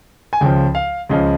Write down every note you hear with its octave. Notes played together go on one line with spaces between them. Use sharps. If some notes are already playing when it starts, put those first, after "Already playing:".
G#5
C#2 C#3 F3 G5
F5
C#2 C#3 F3 D#5